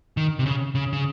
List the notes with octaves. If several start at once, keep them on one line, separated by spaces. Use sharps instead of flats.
D#3
C3
C#3
C#3
C#3